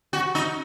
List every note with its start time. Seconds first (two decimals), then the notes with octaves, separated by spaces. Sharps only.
0.13 F#4
0.35 D#4